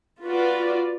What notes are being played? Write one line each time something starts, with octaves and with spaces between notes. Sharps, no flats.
F4 F#4 B4 D5